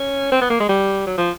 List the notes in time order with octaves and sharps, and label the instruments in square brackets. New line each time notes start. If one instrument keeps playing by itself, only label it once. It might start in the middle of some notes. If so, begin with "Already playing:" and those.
Already playing: [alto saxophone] C#4
C4
B3
A#3
G#3
G3
F#3
F3